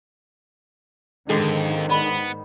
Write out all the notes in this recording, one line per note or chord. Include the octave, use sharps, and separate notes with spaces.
F2 G#2 D3 D#3 G#3
B3 D5 B5